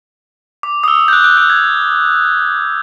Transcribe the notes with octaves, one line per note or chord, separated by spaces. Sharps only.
D6
D#6
E6
G6
F#6
F#6
F#6
G#6